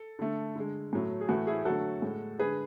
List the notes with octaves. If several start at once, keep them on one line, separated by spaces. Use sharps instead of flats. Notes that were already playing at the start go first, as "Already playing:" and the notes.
Already playing: A4
D3 A3
D3 G#3
A2 F#3 A3
G#4
A2 E3 A3 F#4
E4 G#4
D3 F#3 A3 F#4 A4
A2 G#3
D3 G#3 G#4 B4